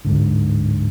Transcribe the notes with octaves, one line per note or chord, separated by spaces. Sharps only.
D1 G#2 D3